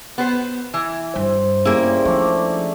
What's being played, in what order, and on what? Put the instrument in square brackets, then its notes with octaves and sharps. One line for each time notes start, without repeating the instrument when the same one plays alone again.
[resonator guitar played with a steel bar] B3 C5
E3
[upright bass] G2 [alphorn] C5
[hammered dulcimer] C#3 G3 [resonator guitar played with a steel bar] A#3 E4
[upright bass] F3 [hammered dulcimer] A3 D4